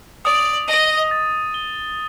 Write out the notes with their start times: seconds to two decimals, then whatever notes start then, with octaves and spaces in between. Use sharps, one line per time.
0.25 D5 D#6
0.68 D#5 D#7
1.11 A6
1.54 G7